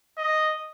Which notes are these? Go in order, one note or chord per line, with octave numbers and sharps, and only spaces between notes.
D#5